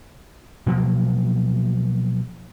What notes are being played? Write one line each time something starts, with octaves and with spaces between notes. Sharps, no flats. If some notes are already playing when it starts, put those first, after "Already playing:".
B2 F3 F#3 A#3